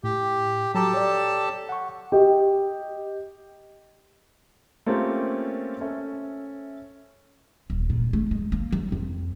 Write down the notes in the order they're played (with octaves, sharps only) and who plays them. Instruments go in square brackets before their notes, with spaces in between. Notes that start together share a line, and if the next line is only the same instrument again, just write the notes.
[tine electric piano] A2 [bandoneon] G4
[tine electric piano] F#3 A#5 D6 [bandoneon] G4 A4 A5
[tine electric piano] C#5 D5
F#5 C#6
[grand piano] G4 D#5
A3 A#3 C4 C#4 F4 G4
C#4 A4 E5
[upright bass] D#1
A#2
A3
G#3
A#3
F#3
F2